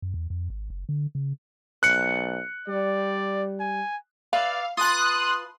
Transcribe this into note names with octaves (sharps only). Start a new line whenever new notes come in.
F#2
E2
F2
G#1
F#1
D3
C#3
B1 F#6 C#7
G3 D5
G#5
B4 D5 E5 F5
F4 B4 A5 C6 D#6 F#6